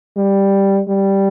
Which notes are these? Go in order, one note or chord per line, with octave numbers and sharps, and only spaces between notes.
G3
G3